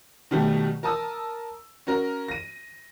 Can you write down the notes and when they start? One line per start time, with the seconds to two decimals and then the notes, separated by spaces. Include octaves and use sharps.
0.31 B2 D#3 F#3 G3 A3
0.83 A#4 A5 D#6 E6
1.87 C#4 F#4 A#4
2.28 A#6 D#7